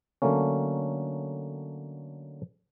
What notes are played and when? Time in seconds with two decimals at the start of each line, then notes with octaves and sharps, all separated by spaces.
0.22 D3 F#3 A3 A#3 C#4